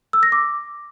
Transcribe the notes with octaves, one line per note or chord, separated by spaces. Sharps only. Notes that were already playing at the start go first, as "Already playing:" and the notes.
E6
A#6
D6